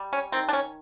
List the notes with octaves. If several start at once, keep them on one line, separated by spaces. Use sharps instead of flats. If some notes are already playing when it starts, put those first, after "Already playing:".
Already playing: G3
C#4
D#3 C4
D4
C#4